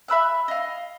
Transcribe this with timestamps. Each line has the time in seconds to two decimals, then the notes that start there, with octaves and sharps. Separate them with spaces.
0.08 E5 B5 E6 F#6
0.48 D#5 F5